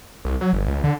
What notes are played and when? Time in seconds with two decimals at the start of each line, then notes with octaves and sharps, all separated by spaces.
0.25 C2
0.41 F#3
0.53 G1
0.68 C#2
0.84 D3